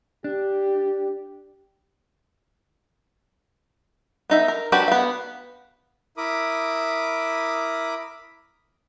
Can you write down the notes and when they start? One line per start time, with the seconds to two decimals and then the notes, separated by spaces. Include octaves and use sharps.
0.24 D4 G4
4.30 B3 D#4 E5
4.48 A#4
4.72 F#3 D4 F#4 G4 B4
4.88 B3 F5
6.17 E4 A#4 B5 D6 D#6